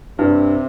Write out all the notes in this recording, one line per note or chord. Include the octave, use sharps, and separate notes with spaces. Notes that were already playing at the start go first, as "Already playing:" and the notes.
G2 C3